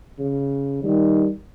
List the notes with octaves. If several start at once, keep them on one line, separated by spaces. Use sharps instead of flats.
C#3
D#3 G3